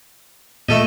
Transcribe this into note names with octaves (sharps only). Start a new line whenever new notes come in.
A#2 A3 A4 D#5